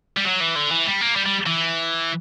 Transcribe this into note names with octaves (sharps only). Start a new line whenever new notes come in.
G3
F#3
E3
D3
E3
G3
A#3
G3
G3
E3